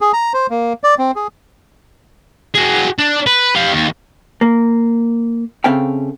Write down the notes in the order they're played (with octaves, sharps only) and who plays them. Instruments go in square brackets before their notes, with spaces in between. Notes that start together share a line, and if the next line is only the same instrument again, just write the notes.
[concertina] G#4
A#5
C5
A#3
D5
C4
G#4
[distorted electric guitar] F#4 G#4
D4
B4
G4 F5
D#2
[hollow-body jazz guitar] A#3
C#3 C4 A4 E5 F5 G5